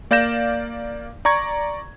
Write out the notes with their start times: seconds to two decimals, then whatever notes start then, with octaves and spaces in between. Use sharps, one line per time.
0.11 A#3 D5 F5 G6 A#6 E7
1.25 D5 A#5 C#6 G#6